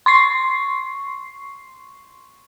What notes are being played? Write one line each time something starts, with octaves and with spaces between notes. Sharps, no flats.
C6 C#6 C7